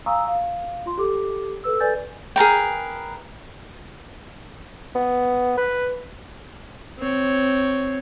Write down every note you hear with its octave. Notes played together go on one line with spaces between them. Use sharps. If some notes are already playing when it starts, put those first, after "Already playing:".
F5 G#5 A#5 C#6 D#6 E6
F5
F4 C6
G4 A4 D6
A4 B4 E6
A4 B4 D5 G#5 G6 A6
G#4 A#4 B4 G5
B3
B4
C4 C#5